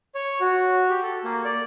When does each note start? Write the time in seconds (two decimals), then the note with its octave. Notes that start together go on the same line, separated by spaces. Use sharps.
0.15 C#5
0.40 F#4
0.90 G4
1.03 A4
1.24 A#3
1.45 D5